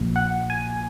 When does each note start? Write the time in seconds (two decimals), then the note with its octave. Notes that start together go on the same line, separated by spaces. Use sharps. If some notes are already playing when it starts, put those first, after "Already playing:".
Already playing: A#1 A#2
0.16 F#5
0.50 G#5